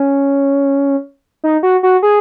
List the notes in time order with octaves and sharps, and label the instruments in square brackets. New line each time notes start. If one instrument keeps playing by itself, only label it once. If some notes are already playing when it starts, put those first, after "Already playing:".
Already playing: [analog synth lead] C#4
D#4
F#4
F#4
G#4